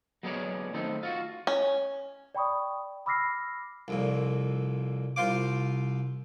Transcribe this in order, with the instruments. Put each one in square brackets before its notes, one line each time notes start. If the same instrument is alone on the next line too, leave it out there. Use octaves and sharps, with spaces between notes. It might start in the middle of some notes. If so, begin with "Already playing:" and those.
[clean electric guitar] F#3 G#3 B3 C#5 D5
D#3 A3 C4 D#4
F4 F#4
[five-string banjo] C#4
[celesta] D5 G5 B5 C#6 D#6
B5 D6 E6 F6 A#6 C7
[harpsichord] C2 F2 A#2
C2 F4 C5 F5 D6